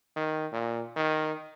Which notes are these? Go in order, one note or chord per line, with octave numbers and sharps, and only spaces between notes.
D#3
A#2
D#3